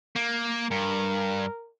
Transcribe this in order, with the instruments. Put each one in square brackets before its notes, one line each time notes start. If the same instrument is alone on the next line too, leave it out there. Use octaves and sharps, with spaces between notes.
[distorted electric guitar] A#3
[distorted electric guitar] G2 [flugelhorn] A#4